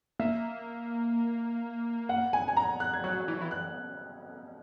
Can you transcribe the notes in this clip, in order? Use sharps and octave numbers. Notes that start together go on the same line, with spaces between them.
A#3 E5
F#5
G#5
G#5
A#5
F#6
G#6
F#3 F#6
E3
F#3
E3
F#6